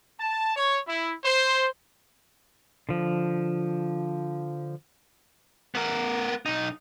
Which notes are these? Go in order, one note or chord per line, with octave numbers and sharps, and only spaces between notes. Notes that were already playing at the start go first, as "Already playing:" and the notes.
A5
C#5
E4
C5
D3 F3
B3 A#4
B1 D#4